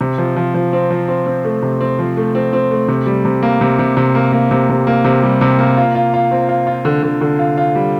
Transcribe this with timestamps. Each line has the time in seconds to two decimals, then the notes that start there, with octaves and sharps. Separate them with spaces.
0.01 C3
0.18 F3
0.36 F3
0.54 F3
0.73 C4
0.90 F3
1.09 C4
1.26 C4
1.45 A3
1.62 C3
1.81 C4
1.99 F3
2.17 A3
2.35 C4
2.53 C4
2.71 A3
2.88 C3
3.06 G3
3.25 C3
3.42 A#3
3.61 C3
3.79 C3
3.97 C3
4.15 A#3
4.32 A#3
4.51 C3
4.69 C3
4.87 A#3
5.05 C3
5.23 G3
5.41 C3
5.59 A#3
5.77 F4
5.95 F4
6.14 F4
6.31 C4
6.49 F4
6.67 F4
6.85 D3
7.03 D3
7.21 D3
7.39 F4
7.58 F4
7.75 G3